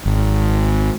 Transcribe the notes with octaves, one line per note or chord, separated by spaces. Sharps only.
G#1